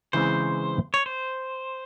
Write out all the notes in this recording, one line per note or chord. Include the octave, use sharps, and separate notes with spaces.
C#3 E3 G#3 C4 C5
C#5
C5